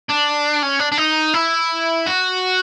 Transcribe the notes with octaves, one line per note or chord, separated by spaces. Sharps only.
D4
C#4
D4
D4
D#4
E4
F#4